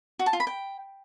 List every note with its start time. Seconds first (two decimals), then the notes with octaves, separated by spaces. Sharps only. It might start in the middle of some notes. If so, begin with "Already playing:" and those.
0.19 F#4
0.26 A5
0.33 F4
0.40 B5
0.47 G5